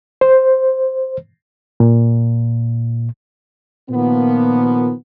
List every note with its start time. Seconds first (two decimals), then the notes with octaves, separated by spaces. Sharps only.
0.21 C5
1.80 A#2
3.90 A#2 D#3 F3 A#3 B3